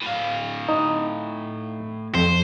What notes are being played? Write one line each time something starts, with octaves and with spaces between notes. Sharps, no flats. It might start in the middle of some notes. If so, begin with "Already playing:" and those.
A2 F5
D#4
F2 C5